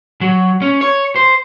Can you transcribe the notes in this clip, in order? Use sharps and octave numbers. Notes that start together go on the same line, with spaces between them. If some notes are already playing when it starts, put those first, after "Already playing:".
F#3
C#4
C#5
C5